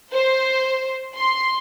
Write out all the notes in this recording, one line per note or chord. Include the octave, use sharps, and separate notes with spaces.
C5
C6